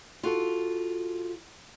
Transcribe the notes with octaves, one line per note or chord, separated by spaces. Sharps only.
F4 F#4 A4